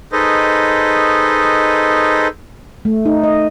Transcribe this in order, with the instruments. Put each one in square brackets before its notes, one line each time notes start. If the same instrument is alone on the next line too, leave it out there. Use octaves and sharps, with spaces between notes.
[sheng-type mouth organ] D#4 G#4 A4 B4 C5 D#5
[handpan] A3
D#4
D#5